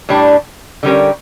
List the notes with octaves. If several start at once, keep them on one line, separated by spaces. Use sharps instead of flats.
A2 G3 D4
D3 G3 C#4 G4 A#4